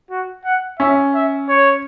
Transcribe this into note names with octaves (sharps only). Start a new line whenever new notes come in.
F#4
F#5
C#4 E5
E5
C#5